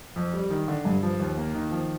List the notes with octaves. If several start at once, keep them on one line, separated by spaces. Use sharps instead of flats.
F2
G3
D#3
D3
G2
F3
D#2
A#3
D#3
F3